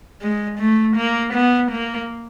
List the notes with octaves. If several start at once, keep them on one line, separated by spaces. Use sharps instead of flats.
G#3
A3
A#3
B3
A#3